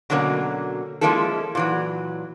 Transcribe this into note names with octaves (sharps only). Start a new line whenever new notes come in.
B2 D3 F#3 A#3 C#4
F3 G#3 A#3 C#4 E4 A4
A#2 E3 F#3